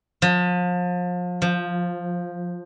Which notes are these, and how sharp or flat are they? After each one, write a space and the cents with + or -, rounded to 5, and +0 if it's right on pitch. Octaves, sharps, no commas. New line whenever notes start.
F3 +35
F3 +5